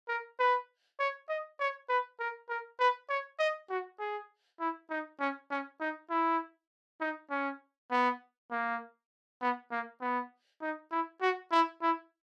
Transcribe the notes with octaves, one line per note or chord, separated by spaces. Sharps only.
A#4
B4
C#5
D#5
C#5
B4
A#4
A#4
B4
C#5
D#5
F#4
G#4
E4
D#4
C#4
C#4
D#4
E4
D#4
C#4
B3
A#3
B3
A#3
B3
D#4
E4
F#4
E4
E4